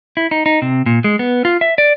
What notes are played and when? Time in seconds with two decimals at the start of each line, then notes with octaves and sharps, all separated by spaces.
0.17 E4
0.31 D#4
0.46 D#4
0.62 C3
0.86 A#2
1.04 G#3
1.19 B3
1.45 F4
1.61 E5
1.78 D5